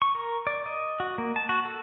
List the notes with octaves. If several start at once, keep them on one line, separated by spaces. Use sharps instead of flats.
C#6
A#4
D5
D#5
F#4
A#3
A5
F#4
A4